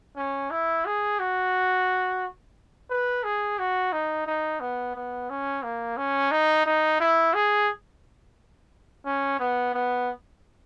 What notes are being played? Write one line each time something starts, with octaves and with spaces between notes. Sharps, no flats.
C#4
E4
G#4
F#4
B4
G#4
F#4
D#4
D#4
B3
B3
C#4
A#3
C#4
D#4
D#4
E4
G#4
C#4
B3
B3